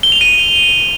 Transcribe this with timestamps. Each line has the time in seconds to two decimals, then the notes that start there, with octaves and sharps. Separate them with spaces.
0.03 G7
0.12 F7
0.21 D#7